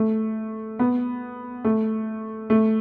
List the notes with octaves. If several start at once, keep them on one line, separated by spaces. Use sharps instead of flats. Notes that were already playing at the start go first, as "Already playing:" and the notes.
Already playing: A3
B3
A3
A3